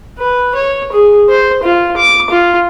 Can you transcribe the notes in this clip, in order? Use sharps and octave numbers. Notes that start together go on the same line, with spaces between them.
B4
C#5
G#4
C5
F4
D6
F4